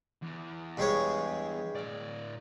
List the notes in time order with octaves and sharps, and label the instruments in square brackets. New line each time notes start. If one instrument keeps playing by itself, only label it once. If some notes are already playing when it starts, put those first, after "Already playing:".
[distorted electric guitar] E2
[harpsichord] G2 G#3 C#5
[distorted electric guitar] A2 D5